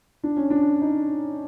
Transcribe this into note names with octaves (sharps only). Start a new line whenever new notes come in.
D4
C#4
D4
D#4